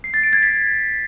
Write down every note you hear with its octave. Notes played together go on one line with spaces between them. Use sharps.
C7
A6
D7
G#6
B6